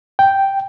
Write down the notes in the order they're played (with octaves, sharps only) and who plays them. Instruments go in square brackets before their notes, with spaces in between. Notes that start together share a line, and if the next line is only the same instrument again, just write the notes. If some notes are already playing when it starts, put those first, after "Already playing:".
[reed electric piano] G5